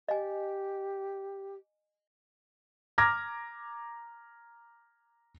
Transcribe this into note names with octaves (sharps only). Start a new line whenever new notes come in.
G4 D#5 G#5
A#5 D6 F6 G#6 A#6